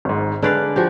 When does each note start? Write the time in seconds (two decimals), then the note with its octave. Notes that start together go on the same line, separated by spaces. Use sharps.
0.05 G#1 G#2
0.42 D3 G#3 B4 D5 F5 F#6
0.76 F3 F#4 G4